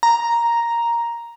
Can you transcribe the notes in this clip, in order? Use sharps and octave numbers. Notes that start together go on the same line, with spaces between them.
A#5